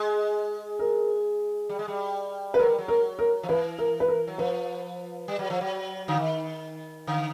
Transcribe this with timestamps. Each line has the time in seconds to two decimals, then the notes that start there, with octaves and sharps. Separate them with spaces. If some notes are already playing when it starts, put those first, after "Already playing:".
Already playing: G#3
0.79 A#4
1.69 G3
1.79 G#3
1.88 G3
2.54 B4
2.59 F#3 A#4
2.69 G3
2.78 F#3
2.88 A#4
3.19 A#4
3.43 F3
3.49 E3 B4
3.79 A#4
4.00 B4
4.08 A#4
4.28 F#3
4.38 F3 B4
5.28 G3
5.39 F#3
5.50 F3
5.61 F#3
6.08 D3
6.18 D#3
7.07 D3